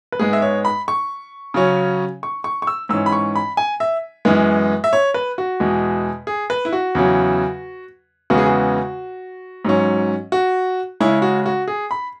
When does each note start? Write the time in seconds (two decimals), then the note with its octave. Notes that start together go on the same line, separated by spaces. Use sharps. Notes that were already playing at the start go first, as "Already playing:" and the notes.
0.12 B4
0.20 G#2 G#3 B3 G#4
0.33 E5
0.42 C#5
0.65 B5
0.88 C#6
1.54 C#3 F#3 C#4
2.23 C#6
2.44 C#6
2.62 C#6
2.67 E6
2.89 G#2 E3 C#4 E6
3.06 B5
3.12 C#6
3.35 B5
3.57 G#5
3.80 E5
4.25 F#2 E3 G#3 B3
4.84 E5
4.93 C#5
5.14 B4
5.38 F#4
5.60 E2 B2 G#3
6.27 G#4
6.50 B4
6.65 E4
6.73 F#4
6.95 E2 C#3 F#3
8.30 E2 C#3 G#3 B3 F#4
8.38 G#4
8.46 F#4
9.65 G#2 F#3 C#4
10.32 F#4
11.00 C#3 G#3 C#4 E4
11.22 F#4
11.46 F#4
11.68 G#4
11.91 B5